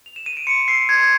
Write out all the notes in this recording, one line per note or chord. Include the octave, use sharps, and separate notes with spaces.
F7
E7
D#7
D7
C6 C#7
E6 C7
C6 G#6